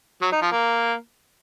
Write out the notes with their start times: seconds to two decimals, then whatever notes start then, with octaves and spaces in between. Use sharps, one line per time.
0.22 F#3
0.32 D#4
0.42 F3
0.52 A#3